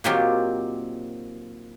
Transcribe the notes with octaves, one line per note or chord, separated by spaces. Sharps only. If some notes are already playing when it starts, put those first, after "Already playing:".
A#2 D#3 F#3 C4 F4 G4